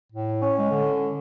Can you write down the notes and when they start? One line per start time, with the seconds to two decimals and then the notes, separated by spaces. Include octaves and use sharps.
0.12 A2
0.42 C#4
0.58 G#3
0.71 D3